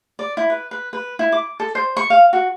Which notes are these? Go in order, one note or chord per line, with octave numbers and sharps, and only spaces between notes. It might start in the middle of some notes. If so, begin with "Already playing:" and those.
D5
E4
B4
B4
B4
E4
D6
A4
C5
C#6
F5
F#4